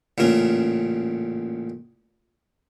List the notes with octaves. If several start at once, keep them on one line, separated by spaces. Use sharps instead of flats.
A1 A#2 C#3 A#4